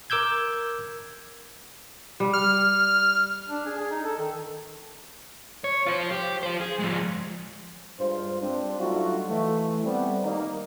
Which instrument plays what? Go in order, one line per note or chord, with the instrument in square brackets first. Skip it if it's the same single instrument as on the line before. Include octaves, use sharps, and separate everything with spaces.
[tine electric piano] A#4 D6 E6 G6 G#6
[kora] G3
[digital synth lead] F6
[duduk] D4
G#4
G#4
D#4
A4
D#3
[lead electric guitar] C#5
F4 C5
G4
F4 C5
G#4
F3 G#3
[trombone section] G2 G#3 F4 C5
G3 C4 D4
F#3 G3 A3 D#4 F4 F#4
E3 A3
G3 B3 C4
D#3 G3 A#3 D#4